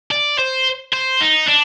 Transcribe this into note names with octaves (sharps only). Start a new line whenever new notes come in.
D5
C5
C5
D#4
D4